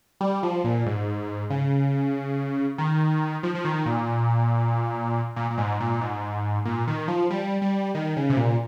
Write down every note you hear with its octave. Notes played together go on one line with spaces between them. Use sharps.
G3
F3
A#2
G#2
C#3
D#3
F3
F3
D#3
A#2
A#2
A#2
G#2
A#2
G#2
A#2
D#3
F3
G3
G3
D#3
C#3
C3
A#2